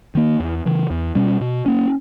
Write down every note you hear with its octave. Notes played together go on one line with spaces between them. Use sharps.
D#3 A#3
E2
C#3 E3
E2
B2 G3 C#4
B2
A#3 C#4